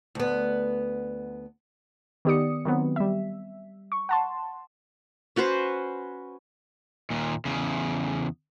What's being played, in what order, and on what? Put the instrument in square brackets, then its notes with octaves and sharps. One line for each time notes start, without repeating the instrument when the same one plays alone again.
[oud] D2 B3
[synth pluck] D#3 B3 G4 D5 D#6 C#7
D#3 F#3 B3 C4
G3 E5
C#6
F#5 A5 C6
[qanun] C#4 F#4 B4 C5
[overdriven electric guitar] D#2 A#2
E2 C#3